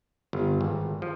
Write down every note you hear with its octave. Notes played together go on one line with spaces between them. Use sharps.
G1
G#1
F3